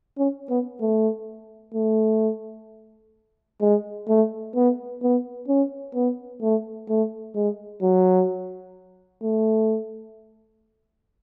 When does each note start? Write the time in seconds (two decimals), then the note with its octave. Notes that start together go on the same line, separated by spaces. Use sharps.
0.18 C#4
0.50 B3
0.81 A3
1.74 A3
3.61 G#3
4.08 A3
4.55 B3
5.02 B3
5.48 C#4
5.95 B3
6.42 A3
6.89 A3
7.35 G#3
7.82 F#3
9.22 A3